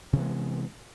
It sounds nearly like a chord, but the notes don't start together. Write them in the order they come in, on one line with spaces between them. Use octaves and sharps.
C3 E3 B3 G#3